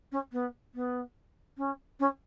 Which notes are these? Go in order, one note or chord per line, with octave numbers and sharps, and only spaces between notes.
C#4
B3
B3
C#4
C#4